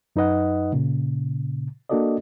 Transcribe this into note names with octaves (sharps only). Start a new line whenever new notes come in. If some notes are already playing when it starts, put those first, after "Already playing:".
F#2 D#4 B4 D#5 F#5
A#2 C#3
A#3 D4 F#4 A4 D5 D#5